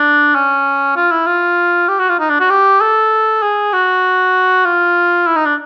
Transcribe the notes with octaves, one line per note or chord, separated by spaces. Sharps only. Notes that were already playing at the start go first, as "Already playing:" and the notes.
Already playing: D4
C#4
F4
E4
F4
G4
F#4
F4
D#4
D4
F#4
G4
A4
G#4
F#4
F4
E4
D#4
D4